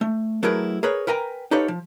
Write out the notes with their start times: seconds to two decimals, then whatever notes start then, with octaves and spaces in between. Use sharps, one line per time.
0.01 A3
0.43 F#3 A3 E4 G#4 A#4 B4
0.83 G#4 A#4 B4 C#5
1.07 A#4 B4 G5 G#5 A#5
1.51 D#4 G4 A4 B4 C#5 F5
1.68 F3